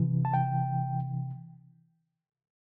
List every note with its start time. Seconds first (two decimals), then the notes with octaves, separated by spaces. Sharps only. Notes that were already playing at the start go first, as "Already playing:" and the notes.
Already playing: C3 E3
0.25 A5
0.34 G5